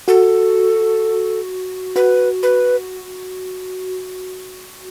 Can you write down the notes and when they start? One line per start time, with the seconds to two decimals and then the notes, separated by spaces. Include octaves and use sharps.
0.08 F#4 A4
1.96 F#4 B4
2.43 B4